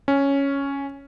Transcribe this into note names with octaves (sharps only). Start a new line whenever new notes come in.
C#4